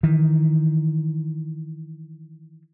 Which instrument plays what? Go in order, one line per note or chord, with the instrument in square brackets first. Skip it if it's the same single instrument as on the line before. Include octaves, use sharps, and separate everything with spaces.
[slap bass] D#3 E3